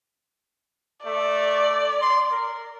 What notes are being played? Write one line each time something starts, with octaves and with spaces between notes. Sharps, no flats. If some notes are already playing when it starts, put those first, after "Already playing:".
A3 D5
C6
A#4